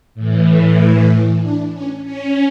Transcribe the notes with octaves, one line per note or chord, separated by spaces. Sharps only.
A2 E3
D4
C#4
C#4